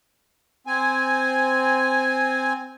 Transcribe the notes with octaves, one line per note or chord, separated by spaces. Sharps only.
C4 G#5